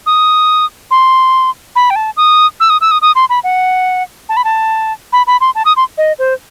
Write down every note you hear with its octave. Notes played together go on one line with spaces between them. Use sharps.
D#6
C6
B5
G5
A5
D#6
E6
D#6
E6
D#6
D#6
C6
B5
F#5
A5
B5
A5
B5
B5
C6
A5
D#6
C6
D#5
C5